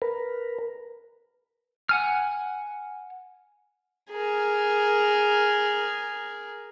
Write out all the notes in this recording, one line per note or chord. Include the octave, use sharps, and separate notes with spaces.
A#4 B4
F#5 G#5 F6
G#4 A#4